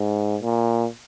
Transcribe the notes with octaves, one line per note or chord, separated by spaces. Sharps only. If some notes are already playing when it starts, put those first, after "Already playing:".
Already playing: G#2
A#2